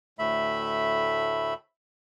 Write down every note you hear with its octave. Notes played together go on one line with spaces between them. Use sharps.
D2 A2 A3 E5 B5